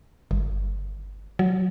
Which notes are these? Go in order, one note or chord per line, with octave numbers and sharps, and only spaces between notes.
G1
F#3